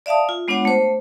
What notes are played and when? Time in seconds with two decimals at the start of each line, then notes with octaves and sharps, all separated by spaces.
0.06 D5 E5 F5 A5 D#6
0.29 F4
0.48 G#3 B3 D4 F4 C#5 F#5
0.65 A3 C5